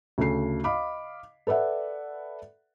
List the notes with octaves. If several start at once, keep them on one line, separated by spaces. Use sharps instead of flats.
D2 C#3 A4 C7
D#5 F5 B5 D6
A4 B4 D5 E5 F#5